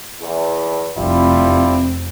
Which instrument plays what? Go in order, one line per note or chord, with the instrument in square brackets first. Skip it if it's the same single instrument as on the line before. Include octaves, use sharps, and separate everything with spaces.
[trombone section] E2
[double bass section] F1 [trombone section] G3 E4 F4 [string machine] C4